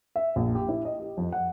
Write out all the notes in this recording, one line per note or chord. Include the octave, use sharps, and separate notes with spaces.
E5
A#1
G4
E4
D#5
G4
F2
F#5